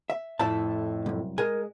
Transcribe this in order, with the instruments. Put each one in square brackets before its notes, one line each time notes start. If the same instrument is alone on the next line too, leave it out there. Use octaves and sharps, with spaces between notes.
[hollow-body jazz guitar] E5
[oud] F2 A2 E4 [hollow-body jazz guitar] E5 A5
[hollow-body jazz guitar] C2 F#2
[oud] G#3 [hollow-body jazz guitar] A#4 G#5